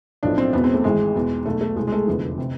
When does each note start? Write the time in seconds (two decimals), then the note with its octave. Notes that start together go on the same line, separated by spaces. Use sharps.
0.23 B1 A2 F3 D4
0.38 C4
0.53 E1 E2 B2 B3
0.64 C4
0.74 A3
0.84 G#1 G#2 E3 G#3
1.14 E2 B2
1.46 B1 B2 A3
1.61 A3
1.76 C2 B2 G#3
1.88 G#3
1.92 A3
2.07 F1 E2 D3 F3 B3
2.38 C3